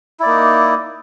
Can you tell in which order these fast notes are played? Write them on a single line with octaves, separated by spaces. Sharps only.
E4 D5 A#3 D#4